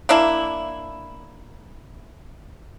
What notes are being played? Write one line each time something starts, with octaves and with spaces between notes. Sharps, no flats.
A#3 D4 E4